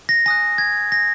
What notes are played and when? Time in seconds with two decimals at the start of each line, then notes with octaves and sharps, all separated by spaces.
0.09 A#6
0.26 G#5 D#6 F#6 A#6
0.58 G#6
0.92 A#6